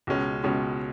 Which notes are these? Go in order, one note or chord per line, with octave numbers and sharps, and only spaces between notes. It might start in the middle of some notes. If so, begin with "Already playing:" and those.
C#2 B2 G#3 C#4
C#2 B2 G#3 C#4